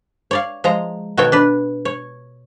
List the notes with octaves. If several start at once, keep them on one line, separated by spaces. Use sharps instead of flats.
C#5 D5 F5
F3 G#3 A#5
B2 D#3 F#4 A4 C#5 G5
D4 B4
C#5